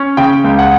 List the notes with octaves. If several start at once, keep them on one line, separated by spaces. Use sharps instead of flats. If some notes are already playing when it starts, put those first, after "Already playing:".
Already playing: C#4
C#3 G5
C#2
F#5